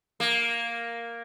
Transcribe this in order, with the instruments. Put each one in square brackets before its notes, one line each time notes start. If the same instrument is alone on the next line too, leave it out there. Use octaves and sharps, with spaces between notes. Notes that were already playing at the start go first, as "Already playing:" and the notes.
[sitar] A#3